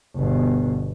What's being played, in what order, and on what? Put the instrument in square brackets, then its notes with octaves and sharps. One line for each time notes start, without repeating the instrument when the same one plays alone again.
[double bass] G1 B2